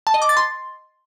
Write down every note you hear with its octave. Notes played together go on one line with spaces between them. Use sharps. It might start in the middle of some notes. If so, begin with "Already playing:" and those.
A5
D#5
D6
A6
C6